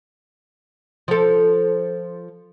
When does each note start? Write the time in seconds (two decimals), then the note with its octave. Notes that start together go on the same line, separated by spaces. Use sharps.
1.08 F3 A4